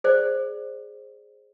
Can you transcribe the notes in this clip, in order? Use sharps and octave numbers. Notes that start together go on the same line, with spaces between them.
G#4 C5 D5